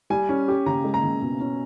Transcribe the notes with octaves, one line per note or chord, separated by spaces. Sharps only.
G3 G#5
C#4
G4
C#3 A#5
G#3
A#5
C#3
B2
C#4